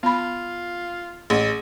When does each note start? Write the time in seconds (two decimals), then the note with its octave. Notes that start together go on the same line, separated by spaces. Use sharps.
0.03 B3 F4 B5
1.30 A1 G#4